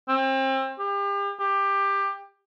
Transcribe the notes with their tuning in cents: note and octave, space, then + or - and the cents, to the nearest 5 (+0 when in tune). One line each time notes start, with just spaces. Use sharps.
C4 +30
G4 +35
G4 +15